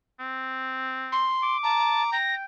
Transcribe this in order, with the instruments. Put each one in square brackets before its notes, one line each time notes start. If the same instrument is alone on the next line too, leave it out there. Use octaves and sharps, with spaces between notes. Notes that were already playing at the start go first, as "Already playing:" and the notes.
[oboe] C4
[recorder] C6
[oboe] D6
[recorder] A5 [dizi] A#5
[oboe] G5 [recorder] A#6